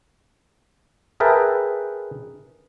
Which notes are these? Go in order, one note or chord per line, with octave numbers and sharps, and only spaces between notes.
G#4 A#4 B4 E5 G5 A5